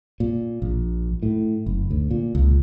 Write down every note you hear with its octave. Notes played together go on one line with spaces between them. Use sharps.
A#2
A#1
A2
F#1
D2
A#2
C#2